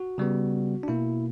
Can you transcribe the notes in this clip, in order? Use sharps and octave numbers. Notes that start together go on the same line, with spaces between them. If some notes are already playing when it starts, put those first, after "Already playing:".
Already playing: F#4
C#3 G3 B3
D4
B2 A#3 E4